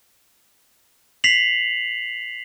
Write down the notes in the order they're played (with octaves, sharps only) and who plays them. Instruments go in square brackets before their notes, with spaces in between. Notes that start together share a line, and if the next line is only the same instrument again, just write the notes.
[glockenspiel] B6 C7 F7 F#7